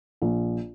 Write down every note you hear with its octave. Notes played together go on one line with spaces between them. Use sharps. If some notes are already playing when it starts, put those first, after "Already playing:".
A#1